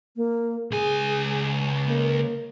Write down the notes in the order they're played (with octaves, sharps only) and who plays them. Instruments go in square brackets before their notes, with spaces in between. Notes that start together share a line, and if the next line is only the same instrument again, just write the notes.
[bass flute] A#3
[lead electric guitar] C#2 G#5 [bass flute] G#4
[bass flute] A#3